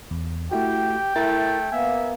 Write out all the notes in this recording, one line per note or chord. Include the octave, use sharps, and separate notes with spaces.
E2
A3 E4 F#4 G4 G5
A3 E4 A#4 A6
A#3 B3 E5 G#5